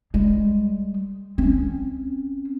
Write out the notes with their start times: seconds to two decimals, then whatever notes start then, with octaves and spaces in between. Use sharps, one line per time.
0.14 G3 G#3
1.38 C4 C#4